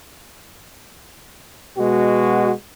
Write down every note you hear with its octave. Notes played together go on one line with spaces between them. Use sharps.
B2 G#3 F#4